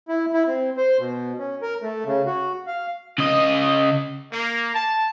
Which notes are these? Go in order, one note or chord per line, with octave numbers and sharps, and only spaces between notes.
E4
E4
C4
C5
B2
C#4
A#4
A3
C#3
F#4
F5
C#3 D#5
A#3
A5